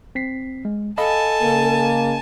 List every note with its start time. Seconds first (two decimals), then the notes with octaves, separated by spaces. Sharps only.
0.15 C4 B6 C7
0.65 G#3
0.98 A4 D#5 F5 G#5 A5 B5
1.42 C#3 A#3